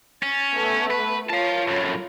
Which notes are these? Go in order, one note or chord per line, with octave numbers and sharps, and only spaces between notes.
C#4 A6
A3 B3 A4
B4
F4 A#4 C#5 F5 A5
F#2 A2